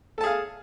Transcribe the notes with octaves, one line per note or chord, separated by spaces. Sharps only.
G#4 A4 F5 A5